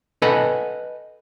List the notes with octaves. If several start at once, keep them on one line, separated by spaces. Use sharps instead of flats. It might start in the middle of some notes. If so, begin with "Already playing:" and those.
A4 B4 D#5 F#5 G#5